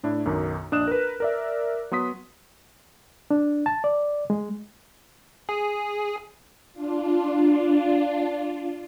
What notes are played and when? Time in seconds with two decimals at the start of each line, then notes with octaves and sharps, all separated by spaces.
0.03 A2 D4 E4
0.25 B1 F#2 D#3
0.72 A#1 D4 D#5 D#6 F#6 E7
0.87 A#4 B4
1.20 A#4 D5 E5
1.91 F#3 B3 C6 D#6 B6
3.31 D4
3.66 A5
3.84 D5
4.30 G#3
5.49 G#4
6.73 D4 F4